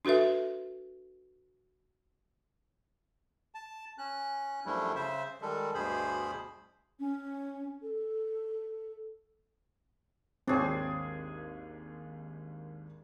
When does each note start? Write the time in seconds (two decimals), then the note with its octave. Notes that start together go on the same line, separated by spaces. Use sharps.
0.05 D4 F#4 A4 B4 E5
3.55 A5
3.98 C#4 F#6
4.66 F#2 F3 G3 A3 D4 E4
4.95 C#3 C5 E5
5.42 D#3 G3 G#3 A4
5.74 D2 G2 B2 G#4 C5 B5
7.00 C#4
7.82 A4
10.48 G#1 D#2 C4 D4 G#4 C#5